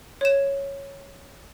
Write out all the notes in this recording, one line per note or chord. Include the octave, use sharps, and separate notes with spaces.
C#5 E7